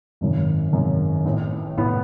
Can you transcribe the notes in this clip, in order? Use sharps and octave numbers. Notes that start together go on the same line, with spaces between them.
G#1 F#2 D#3
G#1 F#2 D#3
A1 A2 E3
A1 A2 E3 B3